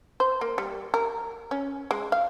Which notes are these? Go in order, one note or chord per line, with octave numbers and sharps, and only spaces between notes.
C5
A#3
G3
A#4
C#4
G#3
F5